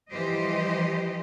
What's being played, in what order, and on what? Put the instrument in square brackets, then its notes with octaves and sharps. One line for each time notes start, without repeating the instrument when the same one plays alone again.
[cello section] E3 F3 G3 G4 C5 D#5